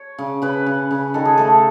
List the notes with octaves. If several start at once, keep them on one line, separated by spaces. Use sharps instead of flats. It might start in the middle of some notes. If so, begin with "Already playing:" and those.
Already playing: C#5
C#3
C#3 B4
C#3
C#3
D#3 A4
G#4
A3 A4